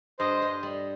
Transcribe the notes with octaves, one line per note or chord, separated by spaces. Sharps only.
G2 C5 D#5
G2
G3